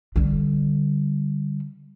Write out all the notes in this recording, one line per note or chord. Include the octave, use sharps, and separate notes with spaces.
D3 G3